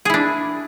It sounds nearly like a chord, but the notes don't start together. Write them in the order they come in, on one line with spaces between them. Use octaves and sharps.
G#4 E4 D4